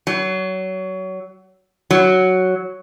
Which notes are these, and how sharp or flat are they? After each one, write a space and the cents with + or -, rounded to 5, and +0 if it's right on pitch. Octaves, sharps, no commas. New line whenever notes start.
F#3 +25
F#3 +5